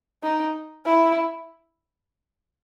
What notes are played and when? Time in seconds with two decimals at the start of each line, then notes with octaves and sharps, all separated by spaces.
0.23 D#4
0.85 E4